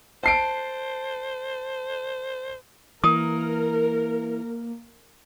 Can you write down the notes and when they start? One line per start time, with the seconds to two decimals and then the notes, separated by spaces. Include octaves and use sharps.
0.24 C5 A5 C7 D7
3.04 E3 A#3 A#4 D#6